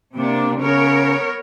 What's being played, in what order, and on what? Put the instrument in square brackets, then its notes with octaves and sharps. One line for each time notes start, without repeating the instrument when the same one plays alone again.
[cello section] C3 D4 [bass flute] A#3
[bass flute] C#3 [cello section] B3 A#4 C#5